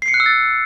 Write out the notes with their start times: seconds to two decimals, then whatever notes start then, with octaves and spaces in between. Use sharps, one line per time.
0.02 C7
0.08 C#7
0.14 F#6
0.20 E6
0.26 A6